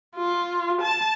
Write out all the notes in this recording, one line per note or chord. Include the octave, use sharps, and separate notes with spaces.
F4
A5